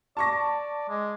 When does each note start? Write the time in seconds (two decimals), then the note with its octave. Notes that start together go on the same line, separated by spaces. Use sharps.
0.17 D5 A5 C#6 A#6
0.89 G#3